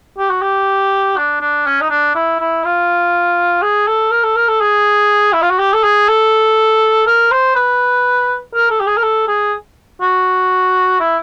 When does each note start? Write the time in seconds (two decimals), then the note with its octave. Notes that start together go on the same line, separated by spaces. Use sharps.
0.18 G4
0.30 F#4
0.42 G4
1.17 D4
1.41 D4
1.66 C#4
1.81 D#4
1.90 D4
2.15 E4
2.40 E4
2.65 F4
3.62 G#4
3.87 A4
4.11 A#4
4.24 A4
4.36 A#4
4.48 A4
4.61 G#4
5.33 E4
5.42 F4
5.50 F#4
5.59 G4
5.73 A4
5.83 G#4
6.08 A4
7.07 A#4
7.31 C5
7.56 B4
8.54 A#4
8.70 A4
8.80 G4
8.86 G#4
8.97 A#4
9.03 A4
9.28 G#4
10.01 F#4
11.00 E4